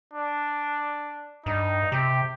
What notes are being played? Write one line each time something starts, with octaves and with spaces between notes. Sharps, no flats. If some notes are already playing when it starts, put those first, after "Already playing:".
D4
G2 D#4
C3 G4